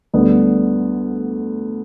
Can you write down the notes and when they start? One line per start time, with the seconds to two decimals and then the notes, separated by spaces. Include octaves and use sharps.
0.13 D2 D3 G3 B3 D4